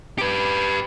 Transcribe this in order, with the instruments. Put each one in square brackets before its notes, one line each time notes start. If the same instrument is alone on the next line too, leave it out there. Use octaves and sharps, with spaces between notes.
[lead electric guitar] G4 B4